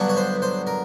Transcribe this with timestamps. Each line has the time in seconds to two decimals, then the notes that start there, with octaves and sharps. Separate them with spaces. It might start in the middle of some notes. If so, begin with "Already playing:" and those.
Already playing: G2 D3 F#3 B3 D4
0.09 C#5
0.17 C5
0.42 C5
0.67 A#4